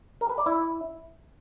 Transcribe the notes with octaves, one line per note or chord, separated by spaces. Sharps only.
A#4
B4
D5
E4